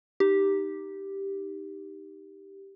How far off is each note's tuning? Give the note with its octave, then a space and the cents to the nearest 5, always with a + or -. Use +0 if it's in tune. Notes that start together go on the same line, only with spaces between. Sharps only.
D#4 +0 G4 +0